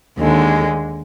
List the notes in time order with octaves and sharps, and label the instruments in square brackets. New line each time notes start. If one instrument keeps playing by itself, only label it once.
[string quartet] D#2 D3 G#3